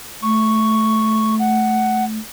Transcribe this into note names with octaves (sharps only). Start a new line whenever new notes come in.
A3 C#6
F#5